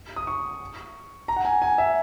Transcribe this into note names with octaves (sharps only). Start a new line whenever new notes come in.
D#6
C#6
A#5
F#5
G#5
G#5
E5